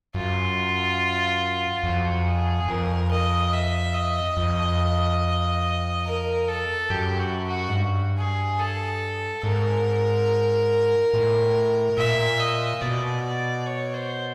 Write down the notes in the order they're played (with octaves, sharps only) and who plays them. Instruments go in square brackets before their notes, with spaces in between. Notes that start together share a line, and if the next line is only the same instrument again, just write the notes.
[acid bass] F#2 [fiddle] F4
[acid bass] F2 [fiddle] F#4
[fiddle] G#4
[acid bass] F2 [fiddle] A#4
[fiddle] D#5
E5
D#5
[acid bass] F2
[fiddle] A#4
A4
[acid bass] F#2 [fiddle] G4
[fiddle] F#4
F#4
[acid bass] G#2
G2
[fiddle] G#4
A4
[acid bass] G#2 [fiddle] A#4
[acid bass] A2
[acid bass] A#2 [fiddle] E5
[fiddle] D#5
[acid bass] B2 [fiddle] D5
[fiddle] C#5
C5